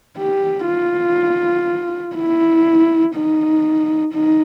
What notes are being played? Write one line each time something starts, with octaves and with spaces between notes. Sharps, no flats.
G4
F4
E4
D#4
D#4